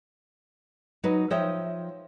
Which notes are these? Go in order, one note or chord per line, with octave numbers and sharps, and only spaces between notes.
F#3 D#4 B4
F3 C#5 D#5 E5 G5